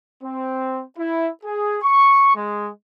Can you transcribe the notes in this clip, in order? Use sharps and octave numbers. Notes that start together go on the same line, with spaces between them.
C4
E4
G#4
C#6
G#3